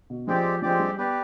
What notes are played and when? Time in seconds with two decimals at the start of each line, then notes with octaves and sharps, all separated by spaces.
0.10 B2
0.27 F3 G#3 C4 G4 D5
0.62 F3 G#3 C4 G4 D5
0.79 G3
0.98 B3 G4 B4 D5